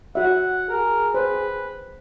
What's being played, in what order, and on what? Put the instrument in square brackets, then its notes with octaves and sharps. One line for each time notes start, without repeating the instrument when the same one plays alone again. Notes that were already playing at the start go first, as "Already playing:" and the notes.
[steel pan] F#4 E5 [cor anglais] F#5
[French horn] G#4 [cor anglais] A#4
[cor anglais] B4 [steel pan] C5